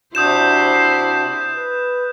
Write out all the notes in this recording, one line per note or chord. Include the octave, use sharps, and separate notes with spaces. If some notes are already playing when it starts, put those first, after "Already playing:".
C3 D4 E4 F#4 C5 D#6 G6 E7
B4